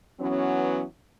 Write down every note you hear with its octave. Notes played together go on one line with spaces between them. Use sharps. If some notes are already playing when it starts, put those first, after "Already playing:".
E3 F#3 B3 C#4